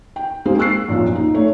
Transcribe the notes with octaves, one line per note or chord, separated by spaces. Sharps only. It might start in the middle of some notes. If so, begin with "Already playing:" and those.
G5
G#3 A#3 C4 C5
C#6 E6 F#6 C7
A#1 F#2 A#2 F3
D#4
A3 C#5